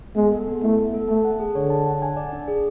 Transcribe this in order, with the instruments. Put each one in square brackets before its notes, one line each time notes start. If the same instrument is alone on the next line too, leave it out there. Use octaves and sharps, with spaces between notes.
[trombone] G#3 [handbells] B3
[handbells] A4
B3
[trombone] A3 [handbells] E4
[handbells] B3
A4
[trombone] A3 [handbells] A5
[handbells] F#5
G#4
[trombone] D3 [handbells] C#5
[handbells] A5
F#5
G#5
D5
D4
G#4